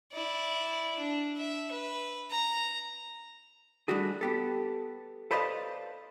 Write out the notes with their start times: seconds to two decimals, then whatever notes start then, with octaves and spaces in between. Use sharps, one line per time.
0.12 E4 D5
0.99 D4
1.37 E5
1.72 B4
2.30 A#5
3.88 G3 A3 D4 F#4 G#4
4.21 B3 G4 A4
5.31 A4 B4 C5 D5 D#5 F5